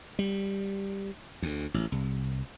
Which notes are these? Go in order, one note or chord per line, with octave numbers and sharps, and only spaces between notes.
G3
D2
A1
C2